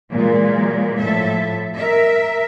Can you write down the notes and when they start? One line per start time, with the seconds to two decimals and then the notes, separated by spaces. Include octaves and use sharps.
0.12 A#2 E3 F#3 G#3
1.00 A2 F3 A4 E5
1.77 A#4 E5